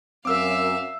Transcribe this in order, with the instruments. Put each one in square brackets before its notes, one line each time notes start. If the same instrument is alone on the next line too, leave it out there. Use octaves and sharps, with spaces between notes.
[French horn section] F#2 [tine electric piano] C4 A#4 [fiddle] E5 F5 [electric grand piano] D6 E6